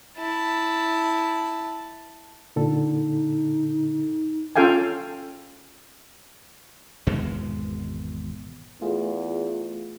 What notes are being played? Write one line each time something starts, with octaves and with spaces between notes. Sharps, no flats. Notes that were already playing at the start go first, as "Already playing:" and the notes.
E4 A5
A#2 D3 D#4 A4
C#4 F4 A4 F5 G5 G#5
G#1 E2 B2 G#3
E2 A3 F4 G#4